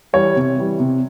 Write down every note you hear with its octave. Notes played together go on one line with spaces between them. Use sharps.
E3 G3 C#5
C3
E3 G3
C3